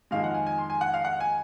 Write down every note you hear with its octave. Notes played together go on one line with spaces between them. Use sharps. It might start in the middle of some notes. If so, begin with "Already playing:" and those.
F2 D#3 G#3 F5
F#5
G#5
G#5
C6
G#5
F#5
F5
F#5
G#5